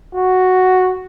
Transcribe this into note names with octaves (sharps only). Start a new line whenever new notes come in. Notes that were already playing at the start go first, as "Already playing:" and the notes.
F#4